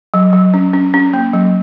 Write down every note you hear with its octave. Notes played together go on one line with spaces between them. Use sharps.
F#3
F#3
C#4
C#4
C#4
A#3
F#3